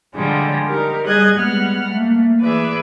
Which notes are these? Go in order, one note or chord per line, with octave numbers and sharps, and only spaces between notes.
D3 F3 G3 G#3
D#4 G4 A#4
G3 G4 G#4 D#5 F#6 G#6
G3 G#3 B3 F#5 F6
A3 A#3
E3 G#4 B4 D5 E5